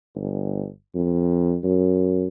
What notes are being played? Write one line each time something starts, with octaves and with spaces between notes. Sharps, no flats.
G1
F2
F#2